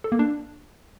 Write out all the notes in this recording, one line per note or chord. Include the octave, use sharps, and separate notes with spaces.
A4
A#3
D4